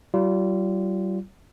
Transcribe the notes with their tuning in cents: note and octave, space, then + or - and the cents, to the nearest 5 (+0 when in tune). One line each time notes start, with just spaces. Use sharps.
G3 -40 F4 -25